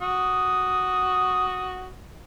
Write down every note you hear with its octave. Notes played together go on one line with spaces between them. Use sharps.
F#4 D#6